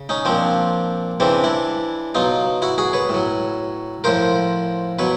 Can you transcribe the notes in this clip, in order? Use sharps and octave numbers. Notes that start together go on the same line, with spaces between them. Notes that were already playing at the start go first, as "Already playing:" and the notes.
Already playing: C#3
C#4 D#4
A#2 F3 C4 D4
C#3 E3 C4 D4
D4 E4
B2 F#3 D#4 F4
E4 F#4
F#4 G#4
B4 C#5
A2 F#3
A2 F3 A#4 C5
B2 F#3 B4 C#5